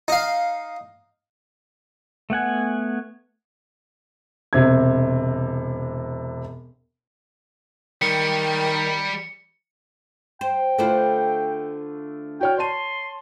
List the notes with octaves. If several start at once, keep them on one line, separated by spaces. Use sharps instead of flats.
D#4 F5
A3 B3 F#5 G#5
E1 C3 G#6
D#3 G3 C#7
C5 G5
D3 A3 F4 B4 C5
F#4 C#5 G5 F6
C#5 A5 C6 D#7